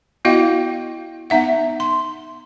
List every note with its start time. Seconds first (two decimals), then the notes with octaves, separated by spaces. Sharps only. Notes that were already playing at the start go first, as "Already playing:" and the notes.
0.25 B3 E4 F#4 D#5 F5 G5
1.30 B3 D#4 E5 F#5
1.80 C6